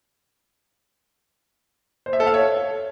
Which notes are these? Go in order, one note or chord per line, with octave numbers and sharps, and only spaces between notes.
C5
E5
A4
F5
C#5